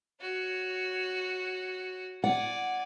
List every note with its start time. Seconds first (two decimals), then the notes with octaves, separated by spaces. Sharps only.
0.21 F#4 C#5
2.24 D5 F#5 G#5